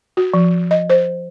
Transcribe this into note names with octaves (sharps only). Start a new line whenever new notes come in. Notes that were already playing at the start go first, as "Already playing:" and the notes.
F#4
F3
D#5
C5